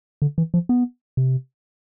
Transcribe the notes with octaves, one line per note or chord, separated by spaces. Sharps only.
D3
E3
F3
B3
C3